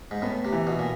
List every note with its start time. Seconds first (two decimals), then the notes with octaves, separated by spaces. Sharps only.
0.11 G#2
0.22 A2 B3
0.45 C3
0.53 E3
0.67 B2
0.79 A#2